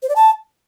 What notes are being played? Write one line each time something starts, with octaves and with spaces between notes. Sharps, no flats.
C5
D5
A5